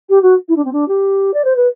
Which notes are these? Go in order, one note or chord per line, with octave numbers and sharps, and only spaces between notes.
G4
F#4
E4
D4
C4
D4
G4
D5
C5
B4